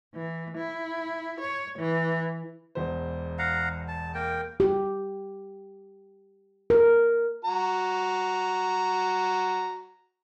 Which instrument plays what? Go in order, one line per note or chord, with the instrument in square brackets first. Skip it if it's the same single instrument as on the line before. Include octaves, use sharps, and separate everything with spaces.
[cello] E3
E4
C#5
E3
[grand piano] E1 E2 C5
[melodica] F5 F#5 A#5
A5
A#3 A#4 G5
[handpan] G4
A#4
[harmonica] F#4 A#5